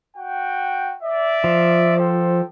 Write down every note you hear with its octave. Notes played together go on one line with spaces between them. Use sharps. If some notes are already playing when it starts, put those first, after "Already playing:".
F#4 G5
D5 E5
F3
A4 C5 G5